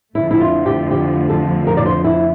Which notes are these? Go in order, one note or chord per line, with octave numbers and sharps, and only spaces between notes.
F2 D3 F3 A3 E4
E4
F4
G4
G4
A4
A#4
D5
C5
E4